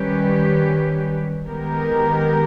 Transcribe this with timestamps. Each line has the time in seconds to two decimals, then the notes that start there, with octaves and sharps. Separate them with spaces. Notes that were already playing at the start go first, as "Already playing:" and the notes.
Already playing: D#3 G3 C#4 G4 B4
1.45 D#3 G#3 B3 G4 A#4